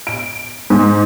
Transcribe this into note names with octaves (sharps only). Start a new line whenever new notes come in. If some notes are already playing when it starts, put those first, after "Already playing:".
D7
G#2